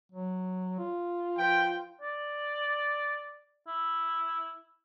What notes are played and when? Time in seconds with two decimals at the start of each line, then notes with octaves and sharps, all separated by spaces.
0.12 F#3
0.79 F4
1.38 F3 B4 G5
2.01 D5
3.67 E4